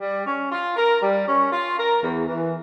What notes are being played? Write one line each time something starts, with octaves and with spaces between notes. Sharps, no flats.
G3
C#4
F4
A#4
G3
C#4
F4
A#4
E2
E3